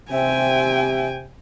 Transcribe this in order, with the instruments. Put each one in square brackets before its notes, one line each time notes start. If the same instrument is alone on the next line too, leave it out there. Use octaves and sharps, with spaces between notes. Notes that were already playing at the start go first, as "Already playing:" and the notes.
[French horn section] C3 [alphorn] C4 [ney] E5 [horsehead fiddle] G5 G#5